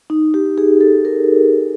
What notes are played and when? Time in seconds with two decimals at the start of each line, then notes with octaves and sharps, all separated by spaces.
0.10 D#4
0.34 G4
0.58 G#4
0.81 A4
1.05 A#4